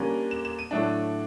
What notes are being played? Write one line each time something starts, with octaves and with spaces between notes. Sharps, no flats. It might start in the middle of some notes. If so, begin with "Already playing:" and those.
Already playing: D3 G3 A#3 C#4 D#7
E7
E7
D#7
A2 F#3 A3 D4